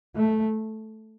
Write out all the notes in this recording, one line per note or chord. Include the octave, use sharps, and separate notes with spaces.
A3